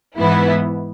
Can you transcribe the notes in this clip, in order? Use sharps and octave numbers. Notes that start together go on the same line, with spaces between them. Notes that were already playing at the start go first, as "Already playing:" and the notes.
G#2 E3 B3 E4